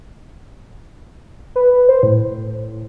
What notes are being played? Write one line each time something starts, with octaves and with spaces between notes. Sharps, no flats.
B4
C5
A2